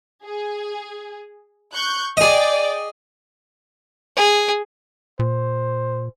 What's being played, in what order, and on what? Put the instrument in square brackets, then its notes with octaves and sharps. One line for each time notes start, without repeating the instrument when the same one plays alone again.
[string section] G#4
C#6 F#6 G6
[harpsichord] G#4 D#5 [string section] D5 G5
[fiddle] G#4
[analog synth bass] A#2 [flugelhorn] C5